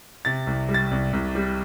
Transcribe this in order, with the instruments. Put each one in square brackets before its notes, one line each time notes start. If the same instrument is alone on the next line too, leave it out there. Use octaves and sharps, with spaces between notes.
[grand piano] C3 A6
C2
G3
A6
C2
C2
G3